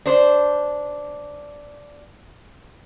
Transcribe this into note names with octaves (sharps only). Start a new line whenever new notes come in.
D4 C5